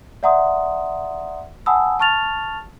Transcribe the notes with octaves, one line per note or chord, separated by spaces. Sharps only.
D5 E5 F#5 A#5 C6 D#6
F#5 G#5 A5 B5 D#6 E6
A5 C#6 F6 A6 F7